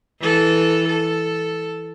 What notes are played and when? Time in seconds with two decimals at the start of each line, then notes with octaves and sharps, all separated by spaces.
0.21 E3 A4
0.89 A4